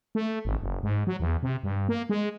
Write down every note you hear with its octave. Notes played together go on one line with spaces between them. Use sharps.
A3
G#1
F#1
G#2
F#3
E2
C3
G2
A#3
G#3